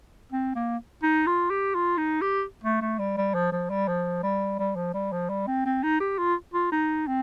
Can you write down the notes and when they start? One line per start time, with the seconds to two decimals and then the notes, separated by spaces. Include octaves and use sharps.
0.32 C4
0.56 A#3
1.03 D#4
1.27 F4
1.51 G4
1.75 F4
1.98 D#4
2.22 G4
2.64 A3
2.81 A3
2.99 G3
3.17 G3
3.34 F3
3.52 F3
3.70 G3
3.88 F3
4.23 G3
4.59 G3
4.76 F3
4.94 G3
5.12 F3
5.29 G3
5.47 C4
5.65 C4
5.83 D#4
6.00 G4
6.18 F4
6.54 F4
6.72 D#4
7.07 C4